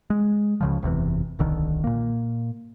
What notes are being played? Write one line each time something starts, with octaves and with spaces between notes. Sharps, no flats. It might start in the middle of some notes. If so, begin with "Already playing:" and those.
G#3
C#2 C#3 F3
F#1 E2 C3 E3
D1 B1 D3 D#3
A#2 A#3